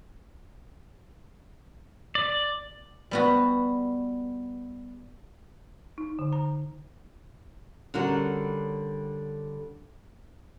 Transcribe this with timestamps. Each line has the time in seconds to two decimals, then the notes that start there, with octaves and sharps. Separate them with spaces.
2.15 D5
3.11 G3 B3 F#4
5.98 D#4
6.19 D3
6.33 A#5
7.94 D3 G3 C#4 D4 F#4 A#4